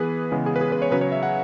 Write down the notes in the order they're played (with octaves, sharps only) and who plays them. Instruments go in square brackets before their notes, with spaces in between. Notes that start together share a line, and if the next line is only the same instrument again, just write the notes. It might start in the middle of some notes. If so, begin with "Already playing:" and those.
Already playing: [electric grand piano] E3 B3 G#4 B4
C#3 E3 G#3 B3
G#4
B4
G#4
B4
C#5
C#3 F#3 C#4 B4
C#5
E5
F#5